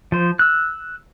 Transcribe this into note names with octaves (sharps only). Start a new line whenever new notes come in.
F3 C5
E6 F#6